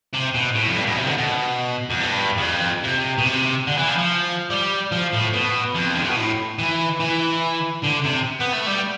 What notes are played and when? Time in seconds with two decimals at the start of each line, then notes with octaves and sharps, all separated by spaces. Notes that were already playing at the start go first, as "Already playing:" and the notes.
0.13 C3
0.34 B2
0.55 A2
0.68 F2
0.76 G2
0.87 B2
0.96 C3
1.07 D3
1.18 B2
1.90 F2
2.00 G2
2.37 E2
2.42 F2
2.84 C3
3.18 B2
3.25 C3
3.67 D3
3.77 E3
3.88 F3
3.98 F3
4.50 G3
4.92 F3
5.13 A2
5.33 B2
5.75 F2
5.95 D3
6.02 C3
6.09 B2
6.17 A2
6.59 E3
7.00 E3
7.83 D3
8.04 C3
8.40 B3
8.53 A3
8.66 G3